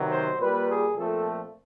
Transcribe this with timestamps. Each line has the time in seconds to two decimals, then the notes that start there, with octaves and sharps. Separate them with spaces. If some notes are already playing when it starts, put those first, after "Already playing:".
Already playing: C3 D#3 F#3 B3
0.12 C5
0.40 A#2 G3 A#3 B4
0.68 G#4
0.96 A#2 F3 A3 C4 A4